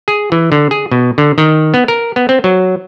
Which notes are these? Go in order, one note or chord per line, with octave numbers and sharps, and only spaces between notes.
G#4
E3
D3
G#4
B2
D3
D#3
B3
A#4
B3
C4
F#3